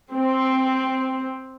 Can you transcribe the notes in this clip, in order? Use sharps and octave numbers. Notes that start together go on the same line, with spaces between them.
C4